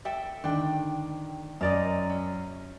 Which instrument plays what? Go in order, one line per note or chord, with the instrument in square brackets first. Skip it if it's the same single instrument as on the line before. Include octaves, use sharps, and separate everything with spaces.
[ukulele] A4 E5 G5
[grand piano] D3 D#3 [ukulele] D4 G5
[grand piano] F#2 [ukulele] A#4 D5 D#5
[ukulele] C#4